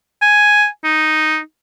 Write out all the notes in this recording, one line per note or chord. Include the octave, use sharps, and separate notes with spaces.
G#5
D#4